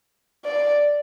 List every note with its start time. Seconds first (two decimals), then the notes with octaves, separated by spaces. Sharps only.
0.45 D5